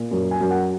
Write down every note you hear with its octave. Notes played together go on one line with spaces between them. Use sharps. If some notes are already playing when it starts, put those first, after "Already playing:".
Already playing: A#2
F#2
G#5
F#2
F#5